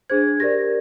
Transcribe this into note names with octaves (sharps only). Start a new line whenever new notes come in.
D4 G#4 C5 G#6
G4 A#4 D5 A#6